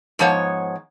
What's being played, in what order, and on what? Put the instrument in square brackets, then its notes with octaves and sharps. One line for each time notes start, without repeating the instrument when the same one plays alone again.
[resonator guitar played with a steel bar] G#2 F3 B3 C#5